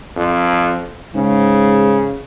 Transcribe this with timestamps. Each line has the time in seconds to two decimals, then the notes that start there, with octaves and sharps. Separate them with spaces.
0.16 F2
1.15 G#2 C#3